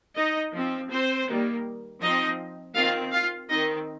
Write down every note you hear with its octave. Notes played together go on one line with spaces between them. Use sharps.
D#4 D#5
F3 C4
C4 C5
D#3 G3 A#3
F3 C4 D#4 D#5
D#3 C4 F4 F5
F4 F5
D#3 C4 D#4 D#5